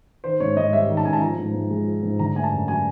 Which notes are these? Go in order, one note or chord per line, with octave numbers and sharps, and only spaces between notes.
D#3 C5
G#2 C#5
G#2 D#5
G3 E5
D#3
A5
G#2 G#5
A5
F3 A#5
G#2
G#2
G#3
F3
G#2
D3 A#5
A3 G#5
A5
F#2
F#3 G#5